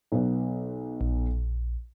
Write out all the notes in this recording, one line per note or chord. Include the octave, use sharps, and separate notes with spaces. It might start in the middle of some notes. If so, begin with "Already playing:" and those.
B1 B3
A#1